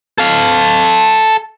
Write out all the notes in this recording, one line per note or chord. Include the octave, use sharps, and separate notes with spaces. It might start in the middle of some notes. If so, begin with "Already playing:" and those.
A4 F5